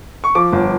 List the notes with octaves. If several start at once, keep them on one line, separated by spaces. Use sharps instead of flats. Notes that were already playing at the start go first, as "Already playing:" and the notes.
C#6
F3 D6
G1